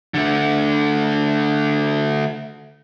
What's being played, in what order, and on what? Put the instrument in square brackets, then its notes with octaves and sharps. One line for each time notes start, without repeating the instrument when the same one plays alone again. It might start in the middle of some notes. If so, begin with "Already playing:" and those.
[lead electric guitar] D3 A3